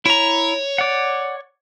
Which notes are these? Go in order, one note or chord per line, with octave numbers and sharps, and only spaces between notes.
E4 C#5 A#5
D5 F#5